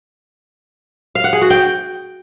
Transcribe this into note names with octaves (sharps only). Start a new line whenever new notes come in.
F5
F#5
G#4
F#4
G5